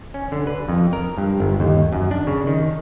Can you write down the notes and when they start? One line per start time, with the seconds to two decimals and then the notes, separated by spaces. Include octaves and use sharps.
0.14 C#4
0.32 D3
0.47 B4
0.69 F2
0.93 A#4
1.18 G2
1.40 G1
1.60 D#2
1.93 F#2
2.11 D4
2.27 C#3
2.47 D#3